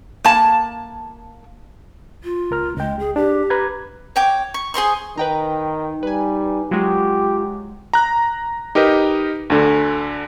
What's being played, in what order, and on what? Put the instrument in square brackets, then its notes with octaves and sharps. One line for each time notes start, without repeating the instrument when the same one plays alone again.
[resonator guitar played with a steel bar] A#3 A5
[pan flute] F4
[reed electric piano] C#2 A#4 F6
[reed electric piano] C#2 G5 [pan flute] G#3
[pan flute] G#4
[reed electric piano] D4 [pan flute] G4
[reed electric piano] B4 A#5 G#6
[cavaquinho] C#5 G5 D6
C#6
G#4 C5 C6 C#6
[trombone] D#3 [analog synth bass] D#4 [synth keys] B4 G5 A#5
[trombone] G3 [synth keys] B4 G#5
[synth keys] F#3 G#3 [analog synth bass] F4 [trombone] G4
[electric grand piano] A#5 F#6
D#4 G4 A#4 B4 D#5
D2 D3 A4